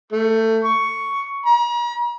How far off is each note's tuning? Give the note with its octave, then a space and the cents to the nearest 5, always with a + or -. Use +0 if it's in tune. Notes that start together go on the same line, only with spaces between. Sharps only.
A3 +20
C#6 +10
A#5 +45